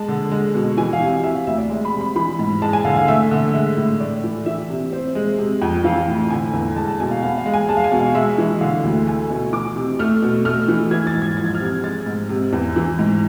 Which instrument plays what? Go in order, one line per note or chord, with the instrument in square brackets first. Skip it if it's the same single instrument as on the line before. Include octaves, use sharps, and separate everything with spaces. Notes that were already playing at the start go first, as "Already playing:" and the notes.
Already playing: [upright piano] G#3 A5
D3
G#3
B2
E3 G#5
F5
C3
G#5
C3 E5
F5
D2 E5
D5
G#3
B5
C3
B5
E3 B5
G#2
G#3 A5
G#5
D3 F5
F5
A3 E5
D3
G#3 E5
A2
A3 D5
E3
E3 E5
C3
C4
G#3
C3
F2
E3 F5
A2
D3 G#5
E2
G#3 A5
A5
B2 G#5
F5
B3 F5
F5
G#3
G#5
G#3 A5
F5
G#5
B2
F5
G#3 E5
E3
D3 F5
D2
A3 G#5
B2
E3 D6
C3
A3 F6
B2
A3 F6
E3
E3 G#6
A6
G#2
G#6
F3 A6
G#6
F6
C3 G#6
G#3 A6
G#2
C3
E2
E3
G#2